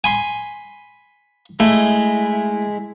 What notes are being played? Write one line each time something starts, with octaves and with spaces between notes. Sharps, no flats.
G#5 B5 C6
G#3 A3 E4